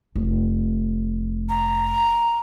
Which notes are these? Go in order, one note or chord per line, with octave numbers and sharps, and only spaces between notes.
F1
A#5